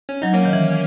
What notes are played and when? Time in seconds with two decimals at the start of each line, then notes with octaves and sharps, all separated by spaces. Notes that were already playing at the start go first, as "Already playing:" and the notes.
0.09 C#4
0.22 F#3 D#4
0.33 A#3 C#4
0.45 D#3
0.53 E3